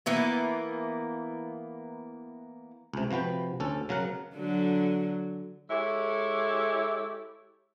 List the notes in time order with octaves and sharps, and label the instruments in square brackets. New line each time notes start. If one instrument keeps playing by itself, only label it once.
[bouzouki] E3 A#3 B3
[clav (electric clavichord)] C#2 C3
C3 F3 F#4 B4 G5
D2 C#4 A4
C#3 F#3 A#4 F#5
[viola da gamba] D3 F#3
[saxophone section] G#3 E4 G4 A4 C#5